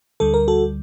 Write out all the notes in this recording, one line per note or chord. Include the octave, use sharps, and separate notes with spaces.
D2 D3 G3 A4
A#4
F#4 A4